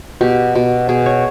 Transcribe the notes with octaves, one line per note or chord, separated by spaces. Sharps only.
B2 G4
B2
B2 G#4
C#5